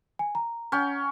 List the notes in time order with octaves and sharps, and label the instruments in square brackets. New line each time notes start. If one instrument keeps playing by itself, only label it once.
[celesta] G#5
A#5
[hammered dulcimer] C#4 G5